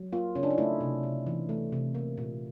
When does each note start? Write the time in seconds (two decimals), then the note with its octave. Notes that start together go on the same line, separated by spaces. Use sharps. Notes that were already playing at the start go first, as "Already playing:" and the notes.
Already playing: F#3
0.12 A#3 F4
0.35 C#3 C#4
0.43 D4
0.50 D#4
0.58 A3 E4
0.81 C3
1.03 C3
1.26 E3
1.49 A3
1.72 C3
1.95 A#3
2.17 A#2